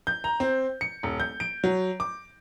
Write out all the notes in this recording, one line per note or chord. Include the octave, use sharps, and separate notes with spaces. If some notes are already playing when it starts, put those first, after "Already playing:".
G6
A#5
C4
C#7
D#1
G6
D7
F#3
D6